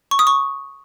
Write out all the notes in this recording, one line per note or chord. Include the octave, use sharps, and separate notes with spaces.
C#6
D#6
C#6